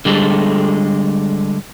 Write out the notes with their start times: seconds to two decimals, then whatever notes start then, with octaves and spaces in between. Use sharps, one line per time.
0.05 D3 G3 G#3 A4